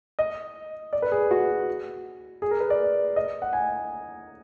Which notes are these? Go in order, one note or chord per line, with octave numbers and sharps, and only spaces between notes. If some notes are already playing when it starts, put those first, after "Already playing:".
D#5
D5
B4
G#4
F#4
G#4
A#4
B4
D5
D#5
F#5
G#5